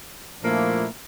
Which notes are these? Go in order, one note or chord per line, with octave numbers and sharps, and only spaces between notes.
A#2 F3 A3 A#3 D4 E4